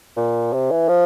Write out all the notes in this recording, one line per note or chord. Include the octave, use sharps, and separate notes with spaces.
A#2
C3
E3
F3